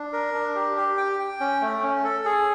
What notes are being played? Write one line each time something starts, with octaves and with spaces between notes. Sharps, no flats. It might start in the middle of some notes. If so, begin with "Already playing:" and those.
Already playing: D4
A#4
D4
G4
G4
G5
G5
C#4
A3
C#4
A4
G#4